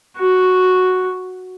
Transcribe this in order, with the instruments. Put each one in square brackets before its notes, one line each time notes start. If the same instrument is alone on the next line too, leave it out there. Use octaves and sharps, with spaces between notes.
[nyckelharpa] F#4